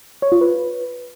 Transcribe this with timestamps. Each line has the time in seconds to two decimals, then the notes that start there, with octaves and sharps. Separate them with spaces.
0.22 C#5
0.32 F4
0.41 B4